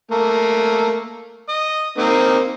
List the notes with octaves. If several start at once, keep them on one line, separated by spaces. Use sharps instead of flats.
A3 A#3
D#5
A#3 C4 D#4